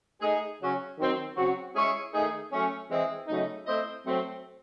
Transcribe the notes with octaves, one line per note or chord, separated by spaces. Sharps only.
A3 D#4 G#4
C#3 F#3 C#4
D#3 F#3 C4
C#3 F#3 C4 F#4
G#3 C#4 E4 G#4 C#5
D#3 A3 D#4 G#4
F#3 A3 C#4
E3 G#3 C4 E4 G#4
C#3 F#3 A3 D#4
A3 C4 E4 C5 D#5
F#3 A3 C4